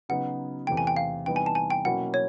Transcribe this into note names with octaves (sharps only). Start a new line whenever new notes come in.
C#3 F#3 B3 D#4 F#4 F#5
E2 C3 E3 A3 G5
G#5
G5
F5
C3 E3 G3 B3 D#4 G5
G#5
A5
G#5
G5
B2 F#3 A#3 C#4 E4 F#5
C#5